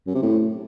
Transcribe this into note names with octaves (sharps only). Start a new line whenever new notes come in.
F#2
C3
A2